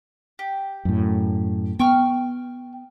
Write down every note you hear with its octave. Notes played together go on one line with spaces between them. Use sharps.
G4
F#2 A2
B3 G5 C#6 F6